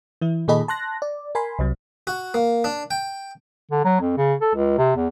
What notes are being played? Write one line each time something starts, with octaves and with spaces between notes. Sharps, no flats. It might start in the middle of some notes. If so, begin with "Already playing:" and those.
E3 E4
A#2 D#3 G#4 A4 D#5 B5
A5 C6 F#6 A#6
D5
A#4 G#5 B5 C6
C2 C3 F#3
F#4
A#3
D4
G5
D3
F#3
F2
C#3
A4
C#2
C3
E2